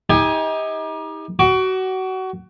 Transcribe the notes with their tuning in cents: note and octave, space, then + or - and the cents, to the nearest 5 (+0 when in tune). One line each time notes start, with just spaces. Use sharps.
D#4 +35 G4 +30 G#5 +0
F#4 +25 D6 +5